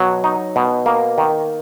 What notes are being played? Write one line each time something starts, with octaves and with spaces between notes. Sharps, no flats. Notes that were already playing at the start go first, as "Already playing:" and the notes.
Already playing: B2 F#3
D#4
B2
A#3
D#3